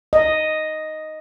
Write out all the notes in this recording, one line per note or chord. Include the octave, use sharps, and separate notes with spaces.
D#5